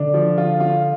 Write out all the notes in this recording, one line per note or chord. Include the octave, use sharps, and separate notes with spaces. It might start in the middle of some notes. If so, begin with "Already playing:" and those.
Already playing: D3 D4
F3
F4
F4